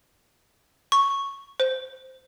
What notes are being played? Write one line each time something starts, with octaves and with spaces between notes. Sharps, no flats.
C#6
C5